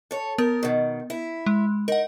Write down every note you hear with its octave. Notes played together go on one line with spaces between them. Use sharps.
A4 C#5
B3 A#4
B2 D#3
E4
G#3
D#4 A#4 F#5